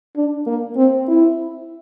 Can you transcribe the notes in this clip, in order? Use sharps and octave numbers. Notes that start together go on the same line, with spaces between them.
D4
A#3
C4
E4